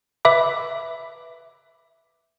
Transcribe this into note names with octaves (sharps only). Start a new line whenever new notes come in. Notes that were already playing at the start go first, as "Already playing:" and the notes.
B4 E5 B5 D6